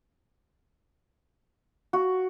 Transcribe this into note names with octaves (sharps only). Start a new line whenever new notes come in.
F#4